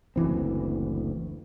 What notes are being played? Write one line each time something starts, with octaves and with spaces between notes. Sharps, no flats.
F#1 D2 E3 C4